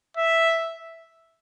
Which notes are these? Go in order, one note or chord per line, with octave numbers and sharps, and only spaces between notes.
E5